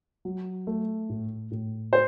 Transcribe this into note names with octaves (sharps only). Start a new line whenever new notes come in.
F#3
A3
A2
A2
C5